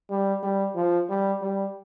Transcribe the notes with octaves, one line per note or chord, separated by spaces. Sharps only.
G3
G3
F3
G3
G3